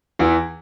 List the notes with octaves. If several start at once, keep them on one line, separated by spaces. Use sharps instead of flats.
E2 E3